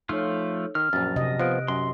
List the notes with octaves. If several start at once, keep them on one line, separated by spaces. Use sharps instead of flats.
F3 A3 D#4 F4 A4 C#5
D#3 F6
A#1 F#2 A6
C3 D#5
F3 B3 F#6 D7
F#2 C6